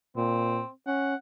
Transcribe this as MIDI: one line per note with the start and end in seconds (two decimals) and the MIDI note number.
0.17 0.62 46
0.17 0.70 60
0.87 1.15 61
0.87 1.15 78